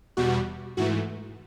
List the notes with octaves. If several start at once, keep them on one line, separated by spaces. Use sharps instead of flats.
E2 B2 G3 F#4
G#2 E3 A3 F#4